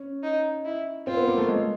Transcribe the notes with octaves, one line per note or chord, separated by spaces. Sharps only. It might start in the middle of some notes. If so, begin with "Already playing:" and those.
Already playing: C#4
D#4
E4
C4 F4
B3
A#3
A3
G#3